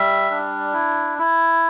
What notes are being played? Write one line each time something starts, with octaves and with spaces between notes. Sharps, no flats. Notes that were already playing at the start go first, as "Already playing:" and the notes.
Already playing: G3 E5
D4
E4
E4